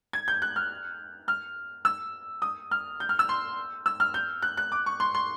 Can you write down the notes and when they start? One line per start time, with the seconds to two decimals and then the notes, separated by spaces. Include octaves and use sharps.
0.13 G#6
0.28 G6
0.42 F#6
0.56 F6
1.28 F6
1.85 E6
2.42 D#6
2.71 F6
3.00 G6
3.09 F6
3.19 E6
3.29 C6
3.86 E6
4.00 F6
4.14 G6
4.42 F#6
4.57 F#6
4.72 D6
4.86 C#6
5.00 C6
5.15 C6